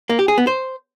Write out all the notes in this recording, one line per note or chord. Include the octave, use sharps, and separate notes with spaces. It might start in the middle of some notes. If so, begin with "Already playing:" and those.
A#3
G4
G#4
B3
C5